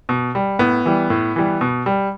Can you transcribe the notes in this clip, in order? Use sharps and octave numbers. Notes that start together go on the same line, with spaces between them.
B2
G3
A2 B3
E3 G3
A2
E3 G3
B2
G3